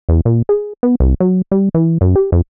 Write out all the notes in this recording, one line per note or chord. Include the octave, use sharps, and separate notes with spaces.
E2
A#2
G#4
B3
C2
F#3
G3
E3
F#2
G4
F2